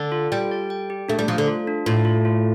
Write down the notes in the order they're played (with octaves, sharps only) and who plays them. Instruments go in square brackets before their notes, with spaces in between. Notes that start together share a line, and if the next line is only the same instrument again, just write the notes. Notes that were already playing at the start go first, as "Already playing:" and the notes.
Already playing: [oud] D3 [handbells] D5
[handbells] F4
[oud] G3 [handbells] G5
[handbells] D5
G5
G4
[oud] A3 [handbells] D4
[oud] G3
[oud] F3 [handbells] A3
[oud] D3
[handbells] F4
D4
[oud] A2 [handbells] F4
[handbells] F4
F4